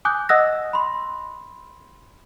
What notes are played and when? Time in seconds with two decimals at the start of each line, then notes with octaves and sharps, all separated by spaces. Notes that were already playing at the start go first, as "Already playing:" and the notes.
0.05 G#5 D6 D#6 F#6 G6
0.29 D#5 F#5 D#6 E6 F#6 A#6
0.73 B5 C6